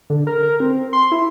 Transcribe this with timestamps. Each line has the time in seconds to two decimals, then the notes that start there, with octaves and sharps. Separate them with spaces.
0.10 D3
0.27 A#4
0.43 A#4
0.60 C4
0.93 C6
1.12 E4